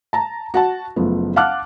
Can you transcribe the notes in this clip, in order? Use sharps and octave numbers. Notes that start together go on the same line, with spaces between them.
A5 A#5
F#4 F#5 A5
F#1 F3 A3 B3
F5 F#5 A5 D6 F6 F#6